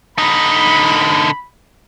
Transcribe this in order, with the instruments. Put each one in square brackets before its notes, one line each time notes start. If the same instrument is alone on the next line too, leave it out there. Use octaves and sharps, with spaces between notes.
[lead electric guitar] D3 D#4 [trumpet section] B5